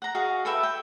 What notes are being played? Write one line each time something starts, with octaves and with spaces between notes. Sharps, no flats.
F#5 A#5
F#4 G#4 D#5 F5
A4 B4 E5 G5
G5